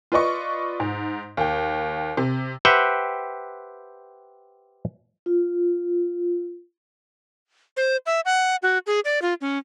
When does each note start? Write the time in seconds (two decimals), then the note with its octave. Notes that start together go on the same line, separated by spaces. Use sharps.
0.12 F4 B4 D5 D#5 C#6
0.80 G#2
1.37 D#2 G5
2.17 C3
2.65 G4 B4 C5 E5 F#5 G5
5.26 F4
7.77 C5
8.06 E5
8.25 F#5
8.62 F#4
8.87 G#4
9.05 D5
9.22 F4
9.41 C#4